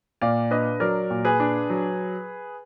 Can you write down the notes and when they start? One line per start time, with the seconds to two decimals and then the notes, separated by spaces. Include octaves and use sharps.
0.21 A#2 D5 F5
0.51 D4 B4 D#5
0.80 F#3 A#4 D5
1.10 A#2
1.25 G#4 B4
1.40 D4
1.70 F#3